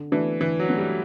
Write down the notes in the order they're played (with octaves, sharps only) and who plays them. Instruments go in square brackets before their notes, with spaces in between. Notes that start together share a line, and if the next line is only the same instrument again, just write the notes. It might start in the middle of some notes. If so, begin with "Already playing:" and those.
Already playing: [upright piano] D3
[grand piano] E3 [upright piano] A3 D4 F#4
[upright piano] D3 [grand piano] E3
[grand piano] F#3
[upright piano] A3 D4 F#4
[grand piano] G3